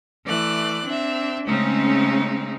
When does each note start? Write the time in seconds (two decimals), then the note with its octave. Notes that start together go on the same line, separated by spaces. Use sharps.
0.24 E3 A3 D5 F#6
0.85 C4 D4 E5
1.46 C#3 G#3 A3 C4 C#4 D#4